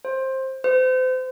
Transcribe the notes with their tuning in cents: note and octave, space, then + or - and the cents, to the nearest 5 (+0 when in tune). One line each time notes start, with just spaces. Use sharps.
C5 +15
C5 -35